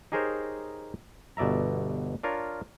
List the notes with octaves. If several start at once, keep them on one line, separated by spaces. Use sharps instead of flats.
D#4 G4 G#4 A#4 C5 C#5
G1 B2 D5 E5 A#5
D4 F4 A#4 C#5